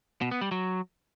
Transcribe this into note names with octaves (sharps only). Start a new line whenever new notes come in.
B2
B3
G3
F#3